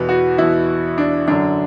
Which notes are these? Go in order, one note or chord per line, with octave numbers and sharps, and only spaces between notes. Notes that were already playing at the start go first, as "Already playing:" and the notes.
Already playing: E2 B2 B4
F#4
E2 B2 E4
D4
F#2 D3 D4